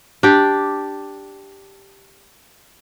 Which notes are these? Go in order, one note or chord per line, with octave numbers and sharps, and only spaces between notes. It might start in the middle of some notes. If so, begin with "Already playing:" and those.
D4 G4